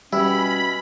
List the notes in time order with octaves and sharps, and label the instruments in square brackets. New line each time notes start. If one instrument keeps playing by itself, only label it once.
[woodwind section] B2 C#4 [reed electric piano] G3 [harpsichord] E4 [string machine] B5